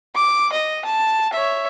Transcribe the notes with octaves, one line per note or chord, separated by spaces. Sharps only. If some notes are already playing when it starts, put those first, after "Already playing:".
D6
D#5
A5
C#5 E5